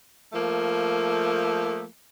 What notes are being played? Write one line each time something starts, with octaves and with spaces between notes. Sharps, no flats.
F3 A3 A#3